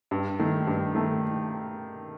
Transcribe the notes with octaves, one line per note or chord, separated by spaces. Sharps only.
G2
D#3 A3
G2
D#3 A3